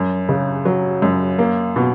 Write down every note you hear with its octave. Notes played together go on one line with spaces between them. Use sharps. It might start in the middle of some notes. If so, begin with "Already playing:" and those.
Already playing: F#2
C#3
F#3
F#2
A#3
B2